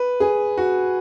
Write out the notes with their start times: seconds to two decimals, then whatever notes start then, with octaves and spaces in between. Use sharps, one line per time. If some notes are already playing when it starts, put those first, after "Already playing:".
Already playing: B4
0.20 G#4
0.57 F#4